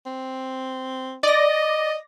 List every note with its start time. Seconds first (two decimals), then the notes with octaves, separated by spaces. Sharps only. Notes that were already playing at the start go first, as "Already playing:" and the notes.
0.06 C4
1.23 D5 D#5 A#6